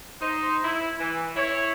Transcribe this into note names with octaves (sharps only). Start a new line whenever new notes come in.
D#4 C5
E4
E3
E4 C#5